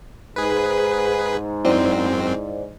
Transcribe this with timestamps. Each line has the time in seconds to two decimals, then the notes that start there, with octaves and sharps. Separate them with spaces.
0.36 G#2 G#4 B4
1.65 F#2 C4 E4 C5 D5